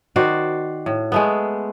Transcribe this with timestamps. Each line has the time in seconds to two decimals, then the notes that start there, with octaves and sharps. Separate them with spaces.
0.16 D#3 F#4 C5 D5
0.86 A2
1.12 G#3 A3 B3